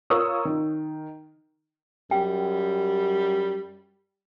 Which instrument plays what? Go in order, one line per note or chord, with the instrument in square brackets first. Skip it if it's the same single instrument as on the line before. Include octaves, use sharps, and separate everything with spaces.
[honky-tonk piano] F4 A#4 C#5 C#6 D#6 E6
D#3
[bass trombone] F#2 [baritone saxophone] G3 [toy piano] G5